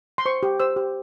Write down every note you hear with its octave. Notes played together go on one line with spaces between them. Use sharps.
C6
C5 C#6
G4
C5 E6
G4